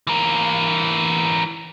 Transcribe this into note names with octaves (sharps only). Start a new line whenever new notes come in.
E3 A#4